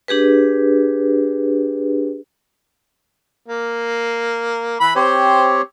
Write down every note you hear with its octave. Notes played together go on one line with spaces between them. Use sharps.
D4 G4 G#4 B4
A#3
E3 B5
C4 G4 C5 C#5